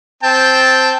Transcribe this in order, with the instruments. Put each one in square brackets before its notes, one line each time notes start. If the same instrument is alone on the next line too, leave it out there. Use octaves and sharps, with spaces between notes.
[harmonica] C4 G5 A5